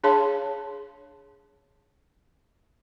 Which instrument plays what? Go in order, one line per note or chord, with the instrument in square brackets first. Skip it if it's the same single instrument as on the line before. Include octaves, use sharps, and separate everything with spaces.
[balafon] D4 G#4 C#5 F5 A5 C6